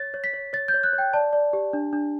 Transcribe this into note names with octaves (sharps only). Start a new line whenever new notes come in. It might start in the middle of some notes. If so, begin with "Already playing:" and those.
Already playing: C#5 A6
C#5
B6
C#5
C#5 A6
G6
C#5
F#6
C#5
G5
D5 A5
D5
G4
D4
D4